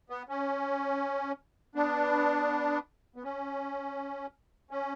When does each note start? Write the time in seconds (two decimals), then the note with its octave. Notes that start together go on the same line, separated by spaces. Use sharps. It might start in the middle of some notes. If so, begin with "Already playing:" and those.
0.10 B3
0.29 C#4
1.75 B3 D4
3.16 B3
3.23 C#4
4.71 C#4